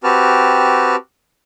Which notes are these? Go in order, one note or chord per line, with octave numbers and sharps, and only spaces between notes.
C4 F#4 G4 B4 A5 F6